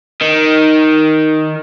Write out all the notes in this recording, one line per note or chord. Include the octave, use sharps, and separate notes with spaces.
D#3